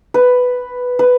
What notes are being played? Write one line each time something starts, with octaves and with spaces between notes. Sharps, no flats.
B4
B4